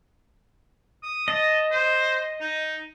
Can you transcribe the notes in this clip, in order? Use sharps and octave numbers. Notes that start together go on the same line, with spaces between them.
D#6
D#5 A5
C5
D#4